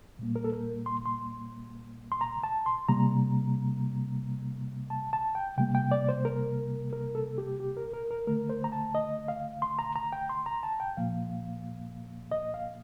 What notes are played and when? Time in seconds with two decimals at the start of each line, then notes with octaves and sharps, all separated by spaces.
0.19 A#2 G3 A#3
0.36 A#4
0.44 A4
0.53 A#4
0.86 C6
1.06 C6
2.12 C6
2.21 A#5
2.43 A5
2.66 C6
2.88 C3 G3 A#3 A#5
4.90 A5
5.13 A5
5.35 G5
5.58 C3 G3 A#3 G5
5.75 G5
5.91 D5
6.09 C5
6.25 A#4
6.93 A#4
7.15 A4
7.38 G4
7.60 G4
7.77 A#4
7.93 A#4
8.11 A#4
8.27 D3 A3 A#4
8.50 C5
8.64 A#5
8.72 A5
8.95 D#5
9.28 F5
9.62 C6
9.79 A#5
9.96 A#5
10.13 G5
10.29 C6
10.46 A#5
10.63 A5
10.80 G5
10.97 A#2 F3 A#3 F5
12.32 D#5
12.54 F5